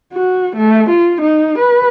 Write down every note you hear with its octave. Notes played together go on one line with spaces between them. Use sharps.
F#4
A3
F4
D#4
B4